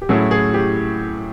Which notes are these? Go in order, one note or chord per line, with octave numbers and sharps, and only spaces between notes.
G4
A2 F#3 A3 C#4 E4 G#4
G#4
G4